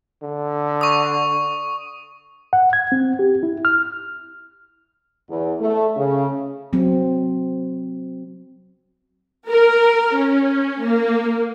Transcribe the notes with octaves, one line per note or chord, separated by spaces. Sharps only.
D3
C#6 D#6
F#5
G#6
C4
G4
E4
F6
E2
A3
C#3
F#3 C4
A#4
C#4
A#3